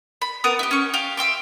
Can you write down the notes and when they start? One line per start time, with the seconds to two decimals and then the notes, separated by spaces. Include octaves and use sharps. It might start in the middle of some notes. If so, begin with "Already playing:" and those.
0.22 B5
0.44 B3 A#4 A#5 D#6
0.59 E4 G4
0.71 C#4 C#6
0.94 G4 F5
1.17 E5 G5 C6 D6